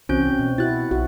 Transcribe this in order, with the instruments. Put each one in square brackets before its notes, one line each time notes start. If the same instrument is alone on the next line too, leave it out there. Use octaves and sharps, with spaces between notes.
[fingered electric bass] C2 E3 [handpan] C4 [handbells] C#4 F#4 G6
[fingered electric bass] B2
[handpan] E4 F#4 [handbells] F#6 A6
[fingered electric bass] B1 [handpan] F#4